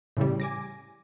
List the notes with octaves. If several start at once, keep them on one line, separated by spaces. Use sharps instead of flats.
A2 C#3 E3 G3
G#5 D6 A#6